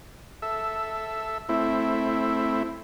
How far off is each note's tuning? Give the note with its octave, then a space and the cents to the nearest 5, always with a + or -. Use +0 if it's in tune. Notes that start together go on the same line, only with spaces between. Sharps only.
A4 +0 E5 +0
A3 +0 C4 +5 E4 +0